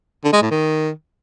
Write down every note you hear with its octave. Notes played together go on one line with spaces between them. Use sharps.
D3
G#3
A2
D#3